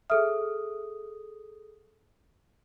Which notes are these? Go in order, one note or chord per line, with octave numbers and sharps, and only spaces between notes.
G#4 A4 E5 D#6 F6